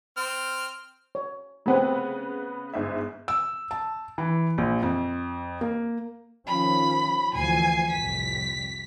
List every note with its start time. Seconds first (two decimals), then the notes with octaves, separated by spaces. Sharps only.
0.17 C4 F6
1.15 C#5
1.66 C#3 A3 B3 C4 B4
2.74 G1 G#2 E5
3.28 E6
3.71 A5
4.18 E3
4.58 A#1
4.83 F2
5.61 A#3
6.47 D#3 F3 C#4 B5
7.35 D2 E3 F3 G#5 C7
7.91 C2 F2 A2 B6